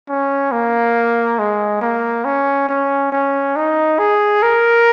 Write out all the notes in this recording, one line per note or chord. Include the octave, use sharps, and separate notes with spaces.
C#4
A#3
G#3
A#3
C#4
C#4
C#4
D#4
G#4
A#4